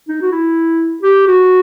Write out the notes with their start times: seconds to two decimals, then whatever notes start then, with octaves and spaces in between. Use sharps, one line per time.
0.08 D#4
0.21 F#4
0.31 E4
1.02 G4
1.27 F#4